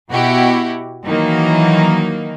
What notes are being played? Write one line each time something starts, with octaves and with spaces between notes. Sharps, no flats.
B2 E4 F#4 G4
D#3 E3 F#3 A#3 D#4